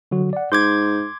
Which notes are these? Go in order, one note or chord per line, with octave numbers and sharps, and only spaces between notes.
D3 F#3 F#4
D5 F#5
G#2 C6 D6 G6 G#6